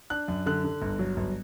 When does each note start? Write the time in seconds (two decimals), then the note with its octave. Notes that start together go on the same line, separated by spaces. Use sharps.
0.10 D4 F#6
0.28 F#2
0.46 D3 F#6
0.64 D3
0.82 G1
0.99 F#3
1.17 G1